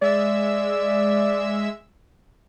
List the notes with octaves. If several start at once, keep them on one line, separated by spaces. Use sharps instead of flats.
G#3 D5 E5 E6